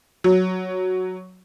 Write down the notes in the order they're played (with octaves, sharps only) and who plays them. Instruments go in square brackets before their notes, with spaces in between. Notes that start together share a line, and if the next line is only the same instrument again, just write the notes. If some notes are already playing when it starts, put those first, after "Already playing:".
[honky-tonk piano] F#3